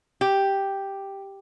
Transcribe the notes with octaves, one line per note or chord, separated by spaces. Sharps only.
G4